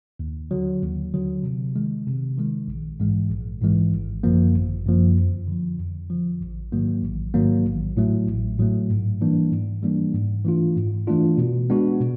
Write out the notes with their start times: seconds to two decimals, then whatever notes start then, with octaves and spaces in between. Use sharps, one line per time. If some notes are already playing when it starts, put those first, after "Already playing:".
0.19 D#2
0.51 D3 F#3
0.82 D#2
1.14 D3 F#3
1.43 C3
1.76 D#3 G#3
2.07 C3
2.38 D#3 G#3
2.68 A#1
3.00 G#2 E3 G#3
3.30 A#1
3.61 G#2 E3 G#3
3.93 G#1
4.23 F#2 D3 F3 A#3
4.55 G#1
4.86 F#2 D3 F3 A#3
5.17 F2
5.47 D3 F3
5.78 F2
6.10 D3 F3
6.41 A1
6.72 G#2 D#3 F#3 A#3
7.03 A1
7.34 G#2 D#3 F#3 A#3
7.66 A1
7.97 A2 F#3 A3
8.28 A1
8.59 A2 F#3 A3
8.89 G#2
9.21 E3 G3 A#3 D4
9.52 G#2
9.83 E3 G3 A#3 D4
10.13 G#2
10.45 E3 A3 D4 F4
10.76 G#2
11.07 E3 A3 D4 F4
11.38 B2
11.70 G#3 B3 D4 F#4
12.00 B2